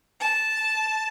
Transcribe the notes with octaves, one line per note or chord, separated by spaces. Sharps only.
A5